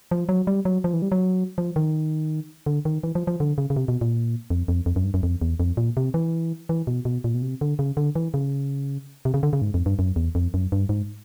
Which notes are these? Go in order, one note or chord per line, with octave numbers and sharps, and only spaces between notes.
F3
F#3
G3
F#3
F3
E3
G3
F#3
F3
D#3
D3
D#3
E3
F3
F3
D3
C#3
C#3
C3
B2
A#2
F2
F2
F2
F#2
G2
F#2
F2
E2
F2
A#2
C3
E3
E3
B2
B2
A#2
B2
C3
D3
C#3
D3
E3
C#3
C3
C#3
D3
C#3
G#2
F2
G2
F#2
E2
F2
F#2
G2
G#2